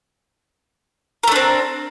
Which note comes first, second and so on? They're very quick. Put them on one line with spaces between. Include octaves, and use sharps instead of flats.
A#4 A3 D4 C4